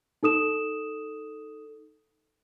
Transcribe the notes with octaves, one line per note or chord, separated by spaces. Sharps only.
D#4 A4 D#6 E7